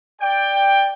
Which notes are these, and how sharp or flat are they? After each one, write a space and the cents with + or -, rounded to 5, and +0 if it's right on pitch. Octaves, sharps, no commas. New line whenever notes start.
D5 +0 G5 +10